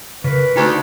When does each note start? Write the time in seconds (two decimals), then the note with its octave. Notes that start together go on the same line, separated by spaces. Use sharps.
0.24 C#3 A#4 B4
0.56 D2 D#4